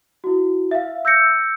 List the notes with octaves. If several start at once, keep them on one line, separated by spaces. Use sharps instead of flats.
E4 F#4
E5 F5
E6 G6 A#6 C#7